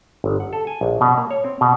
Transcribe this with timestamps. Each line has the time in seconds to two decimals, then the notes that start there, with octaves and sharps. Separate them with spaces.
0.24 G1
0.40 F#5
0.53 A4
0.67 G#5
0.81 A#1
1.01 B2
1.17 A#3
1.31 C#5
1.44 C4
1.61 B2